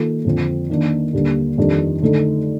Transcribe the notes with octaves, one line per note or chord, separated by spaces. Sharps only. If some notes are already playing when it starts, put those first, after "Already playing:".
Already playing: D#3 A#3 F4 A4
F2 D3 F3 C4
D#3 A#3 D4
D#2 D3 G3 A#3 D4
F2 D#3 G3 D4
D3 A3 D#4 A4